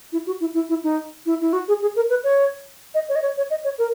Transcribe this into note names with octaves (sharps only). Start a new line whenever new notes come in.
E4
F#4
E4
E4
E4
D#4
E4
E4
F#4
G#4
G#4
A#4
B4
C#5
D#5
C#5
D#5
C#5
C#5
D#5
C#5
A#4